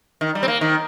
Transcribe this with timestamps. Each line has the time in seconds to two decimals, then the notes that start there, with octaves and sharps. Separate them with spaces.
0.21 D#3
0.35 G3
0.43 C4
0.48 A#3
0.61 D#3